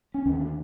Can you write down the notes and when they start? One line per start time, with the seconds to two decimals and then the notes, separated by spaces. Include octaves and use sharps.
0.14 C#4
0.26 D#2 D3 C#4
0.40 D4